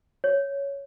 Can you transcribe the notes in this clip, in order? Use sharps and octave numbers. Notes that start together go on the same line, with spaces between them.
C#5